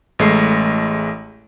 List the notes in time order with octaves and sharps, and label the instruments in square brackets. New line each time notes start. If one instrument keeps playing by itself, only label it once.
[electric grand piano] A1 G#3 A3 C7